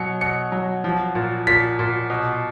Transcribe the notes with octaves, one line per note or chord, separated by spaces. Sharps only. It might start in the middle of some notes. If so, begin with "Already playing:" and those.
Already playing: B2 F#3 C#7
B2 C#7
F#3
F3
A#2
A#2 B6
A#2
B2